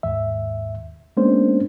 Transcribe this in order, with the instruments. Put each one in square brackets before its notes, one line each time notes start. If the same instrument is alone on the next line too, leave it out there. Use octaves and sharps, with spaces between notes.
[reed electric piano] D#2 G#2 E5
G#3 A#3 B3 C#4 D4 C5